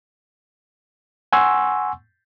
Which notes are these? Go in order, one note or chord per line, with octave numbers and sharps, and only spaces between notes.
F#5 G#5 C6 C#6 E6